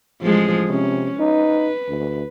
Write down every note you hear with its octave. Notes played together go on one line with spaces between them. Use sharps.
A1 F3 G#3 G#4
C3 C#4
D#4 B4
D2